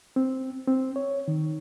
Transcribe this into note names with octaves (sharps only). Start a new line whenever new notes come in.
C4
C4
C#5
D#3